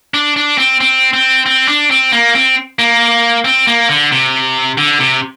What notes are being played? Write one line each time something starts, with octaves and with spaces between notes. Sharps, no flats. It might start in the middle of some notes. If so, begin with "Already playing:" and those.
D4
D4
C4
C4
C4
C4
D4
C4
A#3
C4
A#3
C4
A#3
D3
C3
D3
C3